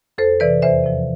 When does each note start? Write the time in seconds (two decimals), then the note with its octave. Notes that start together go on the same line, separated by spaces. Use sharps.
0.18 F2 A4 C5
0.40 C3 E3 B4 D5
0.62 E2 C5 E5
0.84 C3 F3